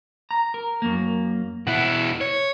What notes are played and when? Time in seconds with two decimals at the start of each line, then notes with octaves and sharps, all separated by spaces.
0.31 A#5
0.54 A#4
0.82 F#2 A#3
1.67 B2 E4 F#5
2.21 C#5